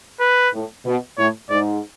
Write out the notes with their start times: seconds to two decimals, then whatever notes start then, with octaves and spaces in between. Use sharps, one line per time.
0.20 B4
0.53 A2
0.86 B2
1.18 A2 C#5
1.50 G#2 D5